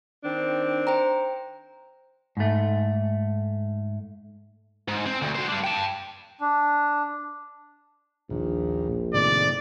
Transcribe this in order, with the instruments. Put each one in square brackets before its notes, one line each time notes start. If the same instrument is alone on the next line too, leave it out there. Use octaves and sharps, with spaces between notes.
[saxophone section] D#3 C4 D4
[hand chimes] C5 G5 A#5
[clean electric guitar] G#2 A3
[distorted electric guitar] G#2
C4
D2
F#4 C5
G3 D4
G5 A5
[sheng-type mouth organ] D4
[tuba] A#1 [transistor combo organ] D#2 A#2
[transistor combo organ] A2 C3 D#3 [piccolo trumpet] D5